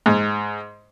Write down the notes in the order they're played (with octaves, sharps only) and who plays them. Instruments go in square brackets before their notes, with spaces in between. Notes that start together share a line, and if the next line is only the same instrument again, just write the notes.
[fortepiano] G#2